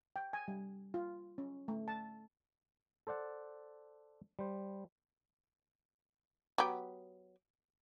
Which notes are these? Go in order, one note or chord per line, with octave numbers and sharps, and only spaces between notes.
G5
G#5
G3
F4
C#4
A3
A5
A4 C5 D5 F#5 A5
G3 C5
F#3 B3 G4